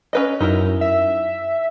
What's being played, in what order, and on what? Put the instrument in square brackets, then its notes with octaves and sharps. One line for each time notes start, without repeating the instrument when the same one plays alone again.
[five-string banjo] C#4 B4 D#5
[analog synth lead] F#2 [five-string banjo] D#4 E4 A#4
[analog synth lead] E5